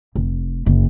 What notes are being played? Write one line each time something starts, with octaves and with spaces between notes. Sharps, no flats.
F1
F#1